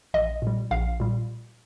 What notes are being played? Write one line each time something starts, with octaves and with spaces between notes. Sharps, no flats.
A#1 D#5
A#2 G3
A#1 F5
A#2 G3